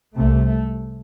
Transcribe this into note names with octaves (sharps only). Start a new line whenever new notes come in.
C2 C3 A3